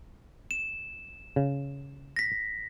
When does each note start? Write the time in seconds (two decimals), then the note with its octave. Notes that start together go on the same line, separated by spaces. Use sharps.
0.51 E7
1.36 C#3
2.16 A#6 B6